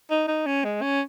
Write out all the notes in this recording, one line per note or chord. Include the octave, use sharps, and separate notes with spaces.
D#4
D#4
C#4
G#3
C#4